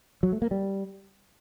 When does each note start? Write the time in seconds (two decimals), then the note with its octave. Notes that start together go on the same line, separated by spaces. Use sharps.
0.23 F#3
0.32 A3
0.42 A#3
0.51 G3